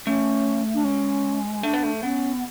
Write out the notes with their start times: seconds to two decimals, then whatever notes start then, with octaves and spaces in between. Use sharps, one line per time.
0.07 A3 C#4
0.74 D4
0.84 G#3 C#4
1.63 A3 D4
1.73 B3
1.83 A3
2.03 B3 C#4